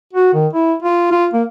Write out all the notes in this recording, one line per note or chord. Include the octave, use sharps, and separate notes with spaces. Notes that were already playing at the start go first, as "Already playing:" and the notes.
F#4
D#3
E4
F4
F4
A#3